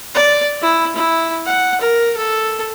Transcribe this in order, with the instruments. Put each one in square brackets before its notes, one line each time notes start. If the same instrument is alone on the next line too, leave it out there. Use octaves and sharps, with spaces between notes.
[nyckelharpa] D5
E4
E4
F#5
A#4
A4